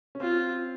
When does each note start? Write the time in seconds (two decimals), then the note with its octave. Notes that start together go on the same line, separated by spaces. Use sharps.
0.15 C#4
0.20 C4 F4